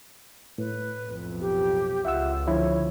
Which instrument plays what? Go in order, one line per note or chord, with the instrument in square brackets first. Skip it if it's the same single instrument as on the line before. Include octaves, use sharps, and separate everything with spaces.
[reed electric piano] A2 [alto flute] B4
[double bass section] B1 F2
[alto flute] G4
[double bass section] C#2 [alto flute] F4 [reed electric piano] E5 F#5 E6
[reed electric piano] D3 F3 E4 [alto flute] C#5